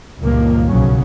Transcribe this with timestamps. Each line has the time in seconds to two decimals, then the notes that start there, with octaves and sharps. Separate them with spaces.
0.21 C#2 G2 A#2 D#3 F3 A#3
0.67 B1 C#3 F#3 C#4